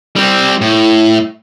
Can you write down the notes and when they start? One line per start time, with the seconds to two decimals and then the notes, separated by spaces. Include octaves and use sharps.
0.16 G3 C4
0.61 A2